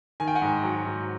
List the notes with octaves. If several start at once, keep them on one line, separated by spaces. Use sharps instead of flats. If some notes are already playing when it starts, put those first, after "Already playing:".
D#3 G#5
G5
F#5 G#5
G#2
F#3
G#2